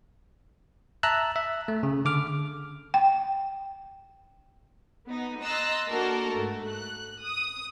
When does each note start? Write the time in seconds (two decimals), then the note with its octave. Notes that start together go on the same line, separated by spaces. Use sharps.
1.03 E5 A5 A#5 E6 F#6
1.36 E5
1.68 A3
1.83 C#3
2.05 D3 D6 F6
2.94 G5
5.09 B3 D#4
5.43 D#5 A#5 C6 E6 F#6 A6
5.89 A#3 D4 F#4 A4 A#4
6.32 G#2 A3
6.67 F#6
7.22 D#6